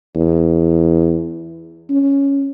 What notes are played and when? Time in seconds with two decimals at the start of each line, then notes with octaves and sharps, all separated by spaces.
0.15 E2
1.90 C#4